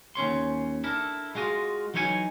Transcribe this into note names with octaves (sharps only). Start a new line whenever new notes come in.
D#2 C#4 C#5 C6
D4 E4 A4 A#4
G#3 F4 F#4 D#5
E3 F#3 D#4 C#5 E5 G#5